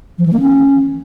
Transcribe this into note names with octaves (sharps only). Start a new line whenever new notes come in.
F3
E3
A#3
C#4